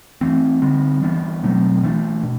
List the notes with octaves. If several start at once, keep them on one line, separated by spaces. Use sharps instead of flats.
E3 A3 C4
D3 G3 C4
E3 G3 B3 D4
B2 F#3 A3 C4
E3 A3 D4
B2